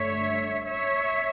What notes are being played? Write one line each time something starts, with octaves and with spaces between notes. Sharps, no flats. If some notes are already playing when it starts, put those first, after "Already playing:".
Already playing: G2 D3 A3 C#5 E5
C#5 E5